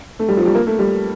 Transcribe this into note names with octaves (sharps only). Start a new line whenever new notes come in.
A3
G3
F3
G3
A#3
A3
G3